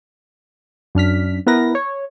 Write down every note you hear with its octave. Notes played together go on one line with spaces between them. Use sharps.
F#2 D4 F6 B6
B3 E4 A#4 B4 A#6
C#5